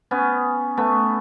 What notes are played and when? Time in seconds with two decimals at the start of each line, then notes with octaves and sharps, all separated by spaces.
0.11 B3 C#4
0.77 A3 B3